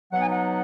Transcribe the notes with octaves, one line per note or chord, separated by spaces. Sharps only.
B2 F#3 B3 D#4 F#5
G#5
F#5